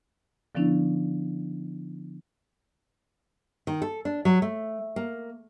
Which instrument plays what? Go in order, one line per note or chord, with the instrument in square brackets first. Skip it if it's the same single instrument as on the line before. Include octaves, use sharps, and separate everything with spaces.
[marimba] D3 F3 B3 C#4 D4 E4
[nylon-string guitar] D#3
A4
D4
F#3
A3
A#3